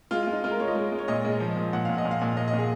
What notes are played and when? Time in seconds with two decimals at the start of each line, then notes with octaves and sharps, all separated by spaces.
0.11 G#3 F4
0.23 F4
0.27 G#3
0.33 D#4
0.44 G#3 F4
0.51 A#4
0.60 G#3 C#5
0.68 D#5
0.75 G#3
0.92 G#3
0.99 C#5
1.08 A#2 D#5
1.24 G#3
1.40 F3
1.57 A#2
1.73 A#2 F#5
1.85 A#2 F5
1.98 D#5
2.05 A#2
2.11 F5
2.21 A#2
2.37 A#2 D#5
2.48 D#5
2.53 A#2
2.58 G#4